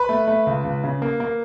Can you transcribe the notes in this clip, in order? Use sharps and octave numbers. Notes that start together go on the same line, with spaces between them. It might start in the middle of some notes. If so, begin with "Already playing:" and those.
Already playing: B4 B5
A3
A3
C#2
C#2
C#3
A#3
A#3